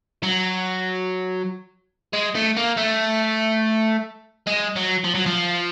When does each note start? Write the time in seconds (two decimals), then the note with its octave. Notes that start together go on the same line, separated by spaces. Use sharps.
0.23 F#3
2.13 G#3
2.35 A3
2.57 A#3
2.77 A3
4.47 G#3
4.76 F#3
5.04 F3
5.15 F#3
5.26 F3